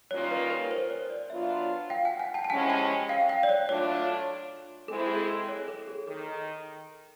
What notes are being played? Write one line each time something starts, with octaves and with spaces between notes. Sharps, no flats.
D#3 G3 A#3 C#4 F4 C#5
B4
A#4
C5
C#5
D5
F#3 B3 D4 F4 E5
F5 G5
F#5 G#5
F#5 G#5
G5 A5
A5
C3 F3 G#3 C#4 E4 F#5 G#5
G#5
G5 A5
F5 G5
F5 G5
D5
C#5
A2 F#3 A3 D4 F4 C#5
G#3 C4 E4 A4
G#4
A4
C#5
A4
G#4
D#3 A4